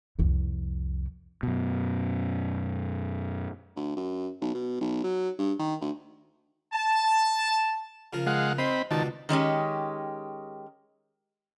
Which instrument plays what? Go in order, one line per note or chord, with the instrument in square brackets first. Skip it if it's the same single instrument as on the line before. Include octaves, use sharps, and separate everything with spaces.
[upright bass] C2 F2
[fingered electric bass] F#2 B2
[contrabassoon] D2
F#2
B1
B2
B1
F#3
G2
D#3
D2
[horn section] A5
[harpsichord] C#3 F3 A#4
[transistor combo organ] G#3 F5 F#5
[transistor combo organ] C4 B5 [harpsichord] D#4 C6
[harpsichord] C#2 B2 D5 [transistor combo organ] D#3 A5
[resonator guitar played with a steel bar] D#3 G#3 C#4 G4